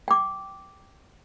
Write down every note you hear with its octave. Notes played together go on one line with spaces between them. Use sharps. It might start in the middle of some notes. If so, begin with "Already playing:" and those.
G5 D6